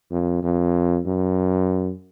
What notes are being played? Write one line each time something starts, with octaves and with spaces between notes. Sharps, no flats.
F2
F2
F#2